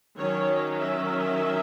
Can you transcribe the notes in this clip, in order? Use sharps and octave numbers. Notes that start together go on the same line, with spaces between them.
D#3 F#3 C#4 C#5
E5